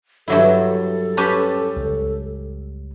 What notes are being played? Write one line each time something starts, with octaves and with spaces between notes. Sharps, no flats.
G2 F#3 E4 A4
C#4 G4 B4 A5
C#2